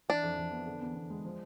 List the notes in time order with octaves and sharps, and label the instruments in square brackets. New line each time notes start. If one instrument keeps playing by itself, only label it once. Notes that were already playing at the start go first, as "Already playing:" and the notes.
[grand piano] E3 [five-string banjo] D4
[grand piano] F2
F2
B3
D3
E2
E2
G#3
F3